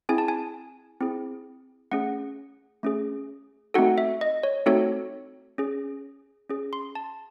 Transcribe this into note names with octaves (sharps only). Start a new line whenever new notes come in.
C4 E4 G#4 G#5
A5
G#5
C4 E4 G#4
A3 C#4 G#4 F#5
A3 C#4 G#4
A3 C4 D#4 F#4 A4 F#5
E5
D#5
C#5
A3 C4 D#4 F#4 A4 C#5
C#4 G#4
C#4 G#4
C6
A5